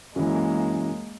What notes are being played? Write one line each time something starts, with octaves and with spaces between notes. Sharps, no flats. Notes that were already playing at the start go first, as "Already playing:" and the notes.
F#2 E3 G#3 A#3